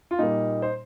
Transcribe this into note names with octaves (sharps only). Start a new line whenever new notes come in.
F4
A#2 G3 A#3 D#4
C5